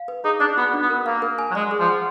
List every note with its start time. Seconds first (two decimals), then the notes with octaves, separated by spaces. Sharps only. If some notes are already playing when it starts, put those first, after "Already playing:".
Already playing: F5
0.08 B4
0.24 D#4 G#4
0.40 D4 D5
0.57 B3 F#4
0.74 D4
0.81 B3
0.90 A#4
1.06 A#3 F5
1.22 A#4
1.38 G#5
1.51 F#3
1.55 G#3 D5
1.71 G#4
1.80 F3
1.88 F#5